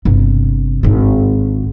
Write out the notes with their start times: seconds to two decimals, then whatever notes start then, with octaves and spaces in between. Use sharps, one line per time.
0.05 G1 C3
0.83 G#1 D3